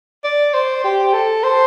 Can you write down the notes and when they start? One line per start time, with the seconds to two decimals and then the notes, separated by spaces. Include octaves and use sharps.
0.24 D5
0.54 C5
0.84 G4
1.13 A4
1.44 C5